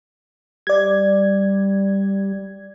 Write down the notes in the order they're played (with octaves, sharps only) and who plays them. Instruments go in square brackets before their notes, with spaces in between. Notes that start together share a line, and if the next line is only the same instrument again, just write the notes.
[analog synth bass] G3 [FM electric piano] D5 G#6